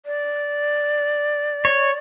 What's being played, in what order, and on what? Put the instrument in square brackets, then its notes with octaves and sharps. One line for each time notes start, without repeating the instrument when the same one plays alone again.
[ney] D5
[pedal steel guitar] C#5